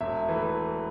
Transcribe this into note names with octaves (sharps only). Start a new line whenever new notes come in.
E1 E5
E3 A3